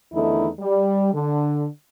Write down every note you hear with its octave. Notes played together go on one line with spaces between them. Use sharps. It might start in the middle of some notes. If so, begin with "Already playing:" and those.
E2 D3 D#3 A3 D#4 E4
G3
D3